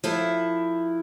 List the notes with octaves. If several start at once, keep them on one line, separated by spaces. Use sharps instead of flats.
F3 E4 A4